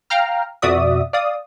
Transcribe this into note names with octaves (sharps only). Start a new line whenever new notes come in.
F5 G5 A#5 F6
F2 B2 F#4 D5 E5 D#6
D5 F5 D#6